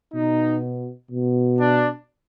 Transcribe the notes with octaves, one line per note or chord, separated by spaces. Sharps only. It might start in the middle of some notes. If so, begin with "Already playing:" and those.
B2 D#4
B2
D4